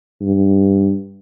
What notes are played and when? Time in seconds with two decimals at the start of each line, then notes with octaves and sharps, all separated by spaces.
0.21 G2